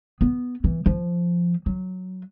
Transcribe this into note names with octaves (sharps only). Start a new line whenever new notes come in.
B3
E3
F3
F#3